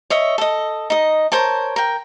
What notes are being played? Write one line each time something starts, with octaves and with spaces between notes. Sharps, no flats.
C#5 D#5 E5
A4 D#5
D#4 D#5
A#4 C5 C#5 A5
A#4 G5